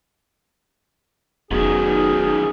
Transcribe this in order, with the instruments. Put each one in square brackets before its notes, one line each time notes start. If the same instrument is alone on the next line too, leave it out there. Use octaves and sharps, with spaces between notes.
[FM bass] F1 [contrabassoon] B1 [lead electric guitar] F#2 D#3 [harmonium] G#4